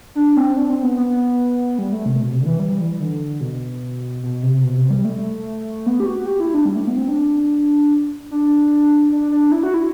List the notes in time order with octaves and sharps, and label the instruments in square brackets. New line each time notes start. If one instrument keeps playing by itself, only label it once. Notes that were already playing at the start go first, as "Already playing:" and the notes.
[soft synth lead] D4
C4
D4
C4
B3
B3
G3
A3
C3
B2
C3
D3
E3
G3
E3
D3
B2
B2
C3
B2
C3
G3
A3
B3
G4
F#4
G4
E4
D4
G3
A3
B3
C4
D4
D4
D4
D4
E4
F#4
E4